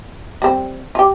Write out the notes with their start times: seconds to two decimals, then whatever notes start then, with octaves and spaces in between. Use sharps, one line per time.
0.42 G3 C4
0.95 F4 G4